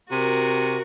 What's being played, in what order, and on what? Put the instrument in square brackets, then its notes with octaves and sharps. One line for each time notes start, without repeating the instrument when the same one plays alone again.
[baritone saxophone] C3 [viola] F#4 A#4